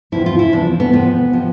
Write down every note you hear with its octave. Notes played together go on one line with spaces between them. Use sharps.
E2 C3 F3 E4
F4
E4
E2 C3 F3 D4
B3
E2 C3 F3 B3
C3 F3